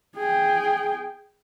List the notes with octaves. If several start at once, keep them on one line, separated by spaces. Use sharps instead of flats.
G#4 G5